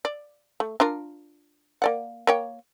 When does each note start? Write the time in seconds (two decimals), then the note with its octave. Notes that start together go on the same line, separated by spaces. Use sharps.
0.05 D5
0.60 A3
0.80 D4 F4 A#4
1.82 A#3 D5 F#5
2.27 A#3 C#5 G5